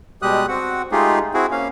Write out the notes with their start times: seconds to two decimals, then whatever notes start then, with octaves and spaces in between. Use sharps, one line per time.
0.22 B2 G3 G#3 G4 D#6 F#6
0.48 C4 F#4 F#5
0.92 G#3 A3 D#4 F4 G4 G#4
1.34 C4 E4 F#4 G#4
1.51 A#3 C#4 F5